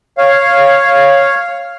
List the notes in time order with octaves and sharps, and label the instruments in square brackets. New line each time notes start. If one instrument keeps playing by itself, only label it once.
[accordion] C#5 F5